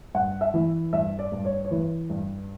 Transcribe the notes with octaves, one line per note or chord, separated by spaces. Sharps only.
G2 F#5
E5
E3
G2 E5
D5
G2
C#5
C#5
E3 B4
G2